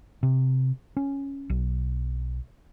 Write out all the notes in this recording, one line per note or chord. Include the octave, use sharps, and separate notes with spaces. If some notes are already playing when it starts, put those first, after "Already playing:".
C3
C#4
B1